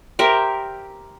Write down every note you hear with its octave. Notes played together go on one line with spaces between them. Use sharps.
G4 A#4 C5 E5